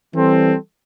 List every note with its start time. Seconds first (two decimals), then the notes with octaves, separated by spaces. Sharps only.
0.14 E3 G3 C4 A4